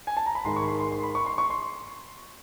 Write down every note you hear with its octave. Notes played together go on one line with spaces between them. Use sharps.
G#5
A5
A#5
B5
G#2 D#3 G#3 C6
C#6
B5
C6
C6
C6
B5
C#6
C6
C#6
C6